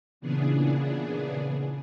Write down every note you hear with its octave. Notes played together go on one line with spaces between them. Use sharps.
A#2 C#3 E3 B3 D4 G#4